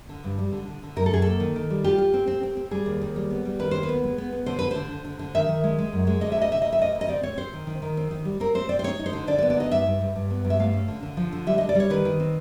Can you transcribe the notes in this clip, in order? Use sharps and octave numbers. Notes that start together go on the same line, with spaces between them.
D3
G2
G3
D3
D3
D3
F#2 A#4
A4
F#2 G#4
A#3 A4
D#3
D#3
G3
F4 G4
F4
C4
C4
C4
C4
G3 G#4
D#2
D#2
G3
B3
G3
D#3 B4
D#2 C5
B4
B3
G#3
B3
B3
D3 C5
D3 B4
D3 C5
D3
D3
D3
D#3 E5
D#3
G#3
G#3
F#2
G#3
D2 D#5
E5
D2 D#5
C3 E5
D2 D#5
E5
D2 D#5
D2
D#5
C4 D5
C4 C#5
C4 C5
D#3
D#3
D#3
C4
D#3
G3
C4 A#4
C4 C5
C4 D5
C5
D#4 C#5
D#4
C5
D3
D3 D5
D5
B3
D5
D#4 D#5
G2 E5
G2
G2
G2
B3
G2
E5
A3 F5
C#4
D3
D3
F3
D3
G3 E5
G3 D#5
D5
G3 C#5
D#3 B4
D#3
C4